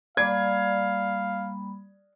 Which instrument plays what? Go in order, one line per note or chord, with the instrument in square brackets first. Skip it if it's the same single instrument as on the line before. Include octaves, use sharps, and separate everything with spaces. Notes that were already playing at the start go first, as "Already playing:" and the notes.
[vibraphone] G3 A#3 B5 [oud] D5 [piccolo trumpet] F5 [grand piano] G#6